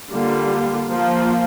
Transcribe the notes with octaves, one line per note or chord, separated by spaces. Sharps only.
D3 G3 A#3 F4
F3 A#3 F4